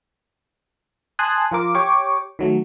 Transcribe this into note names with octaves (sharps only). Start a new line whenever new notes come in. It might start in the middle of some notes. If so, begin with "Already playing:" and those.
G#5 A5 C6 D#6 F#6
F3 F4 A#4 D6
G4 C#5 C#6 D6
D#3 F#3 A3